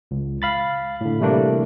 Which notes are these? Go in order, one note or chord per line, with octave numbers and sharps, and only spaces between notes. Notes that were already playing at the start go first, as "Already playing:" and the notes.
C#2
F5 B5 A6
A2 D3
C3 E3 G3 A3 A#3 D4